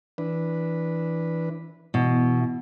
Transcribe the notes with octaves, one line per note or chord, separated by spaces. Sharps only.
E3 D4 B4
B2 E3 E4